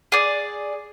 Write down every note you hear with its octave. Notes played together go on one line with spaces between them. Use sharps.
G#4 D5